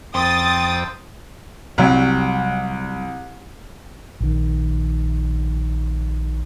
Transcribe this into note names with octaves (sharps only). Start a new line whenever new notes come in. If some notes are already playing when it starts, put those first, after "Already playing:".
F2 C4 G5 D#6 A6
C2 F#3 G3
A#1 D#3